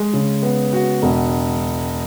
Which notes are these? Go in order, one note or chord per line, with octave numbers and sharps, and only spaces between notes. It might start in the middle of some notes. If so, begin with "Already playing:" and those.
Already playing: G#3
C#3
B3
F#4
E1